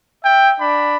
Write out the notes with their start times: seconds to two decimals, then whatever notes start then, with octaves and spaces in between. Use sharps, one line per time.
0.24 E5 G5
0.60 D4 B5